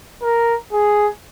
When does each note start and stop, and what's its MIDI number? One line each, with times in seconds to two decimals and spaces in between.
0.22 0.55 70
0.73 1.07 68